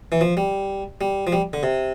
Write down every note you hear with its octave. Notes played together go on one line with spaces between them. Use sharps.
E3
F3
G3
G3
F3
G3
D3
C3